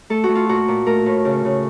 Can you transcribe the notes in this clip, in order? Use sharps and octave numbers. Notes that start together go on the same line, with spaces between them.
A3 A4
F#4
A3
F4
A#2 F#4
A#2
A3 A#4
A2
C#3
C#3